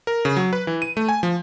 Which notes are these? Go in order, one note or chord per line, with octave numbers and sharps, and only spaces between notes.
A#4
C#3
F#3
B4
E3
D#7
A3
G#5
F3